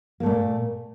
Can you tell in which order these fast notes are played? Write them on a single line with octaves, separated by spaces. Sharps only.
A#3 A3 A#2